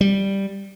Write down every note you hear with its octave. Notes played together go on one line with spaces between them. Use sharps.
G3